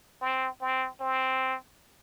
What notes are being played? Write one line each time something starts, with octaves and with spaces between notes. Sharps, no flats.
C4
C4
C4